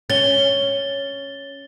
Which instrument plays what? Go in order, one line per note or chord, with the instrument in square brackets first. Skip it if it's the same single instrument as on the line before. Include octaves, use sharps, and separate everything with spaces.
[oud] C#4 [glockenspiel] A6 G7